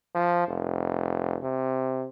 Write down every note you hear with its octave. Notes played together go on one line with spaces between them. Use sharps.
F3
F1
C3